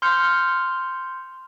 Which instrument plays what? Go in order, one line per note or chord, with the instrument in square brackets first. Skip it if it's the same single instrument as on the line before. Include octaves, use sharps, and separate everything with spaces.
[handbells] C6 F6 G6 C#7